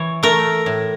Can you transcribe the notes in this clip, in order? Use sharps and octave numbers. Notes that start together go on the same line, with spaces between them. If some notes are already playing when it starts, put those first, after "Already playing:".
Already playing: E3 C#5
A3 A#4
A2